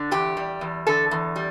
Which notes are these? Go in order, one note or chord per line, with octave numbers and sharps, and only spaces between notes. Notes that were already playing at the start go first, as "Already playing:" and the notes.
Already playing: D3
E2 G4
G3
E2
D3 A4
E2
G3